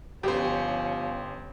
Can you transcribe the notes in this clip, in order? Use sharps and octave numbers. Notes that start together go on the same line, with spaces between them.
G1 F3 B3 C#4 G4 C5